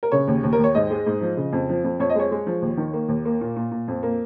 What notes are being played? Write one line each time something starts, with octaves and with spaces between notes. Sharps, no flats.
A#4
C#3 C#5
D#2
D#2
A#4
D#2 C#5
G#2 D#5
G#3
G#2
F3
C#3
F2
F3
F2
F2 C#5
D#5
G#3 C#5
G#3
F3
D#2
D#3
A#3
D#2
A#3
A#2
A#2
A#2
F2
A#3